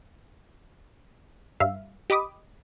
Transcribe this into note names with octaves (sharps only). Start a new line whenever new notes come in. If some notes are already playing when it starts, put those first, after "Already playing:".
G2 E5 F5
G4 D#5 B5 D6 D#6